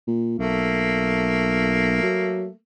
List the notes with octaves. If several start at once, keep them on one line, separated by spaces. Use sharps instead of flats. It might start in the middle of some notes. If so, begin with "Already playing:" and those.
A#2
B1 A3 A#3
F#3